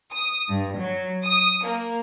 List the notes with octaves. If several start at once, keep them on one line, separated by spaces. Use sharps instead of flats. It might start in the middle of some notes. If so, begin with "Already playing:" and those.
D#6
G2
F#3
D#6
A#3